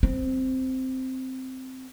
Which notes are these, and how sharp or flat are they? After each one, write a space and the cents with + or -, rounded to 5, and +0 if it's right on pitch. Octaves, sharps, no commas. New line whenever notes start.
C4 -5